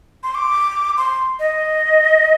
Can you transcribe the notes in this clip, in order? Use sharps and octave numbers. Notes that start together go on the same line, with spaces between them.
C6
D6
C6
D#5